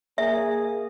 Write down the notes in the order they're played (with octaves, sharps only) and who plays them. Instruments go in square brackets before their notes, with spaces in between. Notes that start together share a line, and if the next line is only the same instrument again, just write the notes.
[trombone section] A#3 G#4 [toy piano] E5